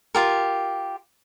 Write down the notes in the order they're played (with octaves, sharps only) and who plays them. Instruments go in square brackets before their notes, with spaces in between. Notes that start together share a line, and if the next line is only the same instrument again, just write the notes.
[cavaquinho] F4 G4 A#4